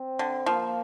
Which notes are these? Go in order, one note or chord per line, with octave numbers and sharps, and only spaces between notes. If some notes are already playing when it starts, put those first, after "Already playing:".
Already playing: C4
D3
F3 A#3